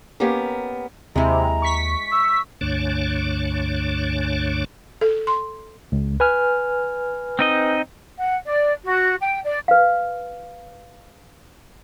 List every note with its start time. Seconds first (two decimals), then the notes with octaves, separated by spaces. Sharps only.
0.20 A#3 B3 C#4 G4 A#4
1.16 D#2 C3 G#3 E4 A#5
1.62 C#6 B6
2.12 E6
2.61 C#2 G2 D3 A3 D4 C#5
5.01 A4
5.27 C6
5.92 C#2
6.20 B4 G#5 F6
7.39 C4 D#4 D#5
8.19 F#5
8.45 D5
8.84 F#4
9.21 G5
9.43 D5
9.68 B4 F5